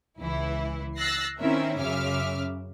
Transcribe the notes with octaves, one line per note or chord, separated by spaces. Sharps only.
C#2 E3 E4
E6 F#6 A6 A#6 C7
D#3 C4 C#4 E4 A#4 E5
F#2 C#3 E5 D6 F6